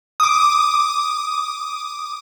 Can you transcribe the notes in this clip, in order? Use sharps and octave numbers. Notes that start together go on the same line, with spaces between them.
D6 D#6